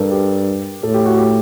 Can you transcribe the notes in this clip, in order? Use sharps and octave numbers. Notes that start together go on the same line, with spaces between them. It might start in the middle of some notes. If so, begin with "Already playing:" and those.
Already playing: G2 A4 A#4
G4
A2 A4
G4
F#4
G4